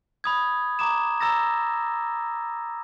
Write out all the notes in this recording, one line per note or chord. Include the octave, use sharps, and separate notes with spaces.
B5 D#6 G#6
A#5 D6 D#6 E7
A#5 E6 A6 A#6